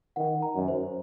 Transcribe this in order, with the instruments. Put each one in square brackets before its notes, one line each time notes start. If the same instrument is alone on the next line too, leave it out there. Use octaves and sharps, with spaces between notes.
[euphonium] D#3 [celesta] F#5
[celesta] A#5
[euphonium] F#2
[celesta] C5